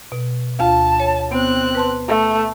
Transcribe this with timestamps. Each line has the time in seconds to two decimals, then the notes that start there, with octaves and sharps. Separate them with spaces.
0.12 B2
0.60 D2 F4 F5 A5
1.00 C#5
1.32 B3 C4 F#6
1.75 B4 A5 C6
2.08 A3